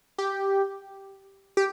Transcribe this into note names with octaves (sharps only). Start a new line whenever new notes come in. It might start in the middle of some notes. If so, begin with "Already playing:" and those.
G4
G4